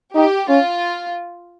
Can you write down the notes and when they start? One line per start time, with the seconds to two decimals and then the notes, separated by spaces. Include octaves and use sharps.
0.15 D#4 G4
0.49 C#4 F4